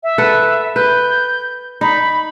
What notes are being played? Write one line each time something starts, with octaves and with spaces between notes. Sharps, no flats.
E5
A4 B4 F#5
B4 G6
D#4 B5